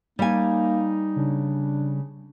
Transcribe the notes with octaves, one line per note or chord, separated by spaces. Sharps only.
G3 A#3 D#4 G#5
C#3 D4